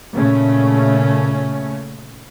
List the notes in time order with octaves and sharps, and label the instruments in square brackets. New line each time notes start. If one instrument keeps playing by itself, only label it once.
[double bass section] A#2 C#3 A3 C#4